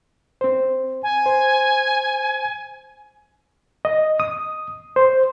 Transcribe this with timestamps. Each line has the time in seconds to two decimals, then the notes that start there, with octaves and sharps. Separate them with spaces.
0.41 C4 C5
1.03 G#5
1.26 C5
3.85 D#5
4.20 D#6
4.96 C5